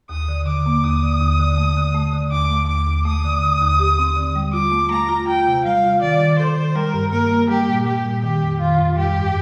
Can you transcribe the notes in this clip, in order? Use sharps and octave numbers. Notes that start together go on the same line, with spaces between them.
D#2 D#6
D3
D3 D6
A#3
D#2 D#6
D3
D#2
D3
A3
D3
A3
D3
D#2 D6
A3
D#2 D6
D#2
A3 D#6
D3
D3
D#2
G4
C4
D3
G3
F4 D6
A3
A3 A#5
F4
F4 G5
C3
G3 F5
F4
D#3 D5
D#3
A4 C5
D#3
G3 A#4
G2
A#3 A#4
A#3
G3 G4
A#2
G3 G4
A#2
D#3 G4
F2
D#3 F4
F2
G3 G4
G2